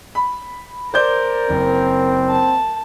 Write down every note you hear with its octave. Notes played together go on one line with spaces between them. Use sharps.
B5
A#4 C5 D5 G6
F#1 C4
A5